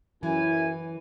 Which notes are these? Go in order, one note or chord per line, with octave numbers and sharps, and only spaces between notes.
F#2 E3 E4 G#5